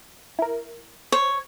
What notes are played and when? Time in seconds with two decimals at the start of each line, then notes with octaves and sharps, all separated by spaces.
0.39 E4 A#4
1.12 C5 C#5